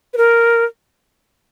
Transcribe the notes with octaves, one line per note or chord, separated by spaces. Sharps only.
B4
A#4